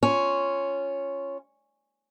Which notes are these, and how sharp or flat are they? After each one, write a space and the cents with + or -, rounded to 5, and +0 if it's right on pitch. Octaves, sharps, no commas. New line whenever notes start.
C#4 +0 F4 -10